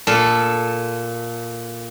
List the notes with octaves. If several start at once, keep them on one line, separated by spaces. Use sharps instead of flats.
A#2 A4